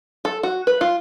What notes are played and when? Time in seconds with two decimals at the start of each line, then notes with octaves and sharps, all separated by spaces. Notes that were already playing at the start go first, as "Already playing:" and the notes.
0.25 A4
0.43 F#4
0.67 B4
0.81 F4